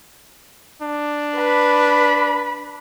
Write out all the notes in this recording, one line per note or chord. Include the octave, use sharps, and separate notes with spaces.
D4
B4 B5